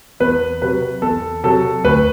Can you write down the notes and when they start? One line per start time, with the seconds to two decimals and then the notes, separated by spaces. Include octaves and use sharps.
0.20 E2 B4
0.61 C3 F#3 B4
1.02 E2 A4
1.43 C3 F#3 A4
1.84 D2 B4